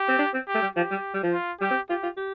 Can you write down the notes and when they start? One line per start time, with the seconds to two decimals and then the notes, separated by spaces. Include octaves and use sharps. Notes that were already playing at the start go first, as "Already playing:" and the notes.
Already playing: G4
0.08 C4
0.19 D4
0.34 C4
0.48 G4
0.55 A3
0.62 G3
0.76 F3 G4
0.91 G3
1.14 G3
1.23 F3
1.33 F4
1.61 G3 G4
1.71 C4
1.90 F4 G4
2.03 F4
2.17 G4